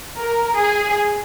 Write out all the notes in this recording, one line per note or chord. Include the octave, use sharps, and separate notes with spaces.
A#4
G#4